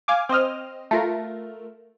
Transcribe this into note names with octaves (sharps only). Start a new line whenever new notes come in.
F5 G#5 D6
C4 C5 D#5 F6
A3 F4 A#4